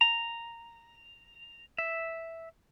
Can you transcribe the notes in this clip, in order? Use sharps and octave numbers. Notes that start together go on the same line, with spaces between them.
A#5
E5